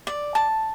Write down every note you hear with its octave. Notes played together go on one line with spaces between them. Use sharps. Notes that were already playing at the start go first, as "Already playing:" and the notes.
D5
A5